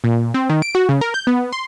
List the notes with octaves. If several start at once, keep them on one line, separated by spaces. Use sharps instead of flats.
A#2
C4
D#3
D7
F#4
C#3
A#4
G6
B3
C6